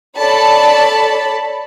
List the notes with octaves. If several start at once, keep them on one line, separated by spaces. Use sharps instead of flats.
A4 C#5 D5 A5 B5